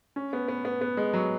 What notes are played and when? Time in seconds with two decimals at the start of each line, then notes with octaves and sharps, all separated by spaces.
0.16 C#4
0.33 B3
0.48 B3
0.65 B3
0.81 B3
0.97 G#3
1.13 F#3